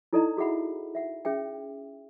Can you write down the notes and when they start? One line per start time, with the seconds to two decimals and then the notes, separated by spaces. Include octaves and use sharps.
0.13 D#4 E4 A4 D5 D#5 A#5
0.37 F#4 G#4 E5 F#5 B5
0.95 E5 F#5
1.25 C#4 G#4 E5 G5